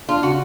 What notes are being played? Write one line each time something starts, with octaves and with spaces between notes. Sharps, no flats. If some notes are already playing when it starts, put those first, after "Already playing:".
D4 F4
C#3 F#4